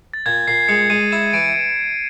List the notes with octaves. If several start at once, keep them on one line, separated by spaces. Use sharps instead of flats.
A6
A#2 G#6
A#2 C7
G#3 C#7
G#3 D#7
E4 E7
E3 D7